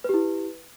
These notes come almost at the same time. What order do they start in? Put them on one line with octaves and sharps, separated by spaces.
B4 G4 E4